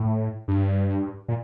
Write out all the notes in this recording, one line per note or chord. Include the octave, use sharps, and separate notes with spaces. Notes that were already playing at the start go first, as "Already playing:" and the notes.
Already playing: A2
G2
A#2